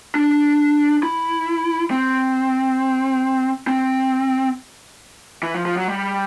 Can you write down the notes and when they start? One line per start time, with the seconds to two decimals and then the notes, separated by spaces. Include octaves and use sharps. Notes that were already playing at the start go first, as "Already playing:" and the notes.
0.15 D4
1.03 E4
1.91 C4
3.67 C4
5.43 E3
5.54 F3
5.66 F3
5.77 F#3
5.88 G3